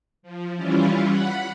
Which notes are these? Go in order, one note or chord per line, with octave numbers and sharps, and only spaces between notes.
F3
E3 G3 C#4 E4 F4
F#5 B5